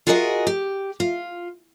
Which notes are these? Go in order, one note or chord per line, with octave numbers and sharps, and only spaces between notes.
F4 F#4 G#4 A#4 D5 D#5
G4
F4